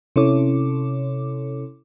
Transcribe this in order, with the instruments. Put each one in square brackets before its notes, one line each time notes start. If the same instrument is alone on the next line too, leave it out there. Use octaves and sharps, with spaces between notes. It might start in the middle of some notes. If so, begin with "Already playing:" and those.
[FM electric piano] C3 C#4 E4 A4 C#5 D6